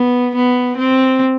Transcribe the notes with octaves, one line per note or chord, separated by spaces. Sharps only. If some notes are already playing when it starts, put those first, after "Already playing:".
Already playing: B3
B3
C4